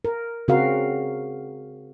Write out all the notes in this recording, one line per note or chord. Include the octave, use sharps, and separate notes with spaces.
A#4
C#3 C4 F#4 A#4 F5